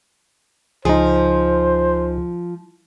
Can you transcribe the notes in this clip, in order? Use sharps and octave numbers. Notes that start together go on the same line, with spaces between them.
C#2 F3 D#4 G#4 C5